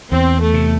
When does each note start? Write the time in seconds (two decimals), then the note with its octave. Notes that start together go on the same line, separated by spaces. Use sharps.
0.12 E2 C4
0.40 A3
0.54 C3